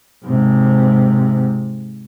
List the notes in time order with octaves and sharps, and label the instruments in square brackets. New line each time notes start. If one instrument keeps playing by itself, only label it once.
[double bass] G#2 C3